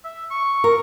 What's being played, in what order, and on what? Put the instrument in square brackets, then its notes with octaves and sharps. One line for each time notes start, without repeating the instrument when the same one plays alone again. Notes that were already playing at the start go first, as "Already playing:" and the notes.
[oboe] E5
C#6
[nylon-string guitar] A#4